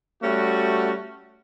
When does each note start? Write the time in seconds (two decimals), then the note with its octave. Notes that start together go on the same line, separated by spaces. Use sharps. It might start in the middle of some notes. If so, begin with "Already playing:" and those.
0.23 G3 A3 C#4 F#4